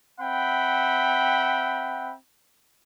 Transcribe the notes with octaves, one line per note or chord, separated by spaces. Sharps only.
C4 E5 F#5 G5 B5